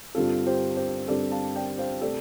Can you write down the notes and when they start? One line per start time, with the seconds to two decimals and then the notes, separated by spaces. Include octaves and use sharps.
0.15 G2 D3 G3 C4 F4 A4
0.47 G4 C5
0.77 G4 C5
1.08 G2 D3 G3 C4 A4 D5
1.32 F5 A5
1.56 D5 G5
1.78 C5 F5
2.01 C3 A3 A4 D5